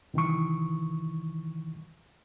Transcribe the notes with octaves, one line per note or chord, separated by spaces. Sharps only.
C2 D#3 E3 C#6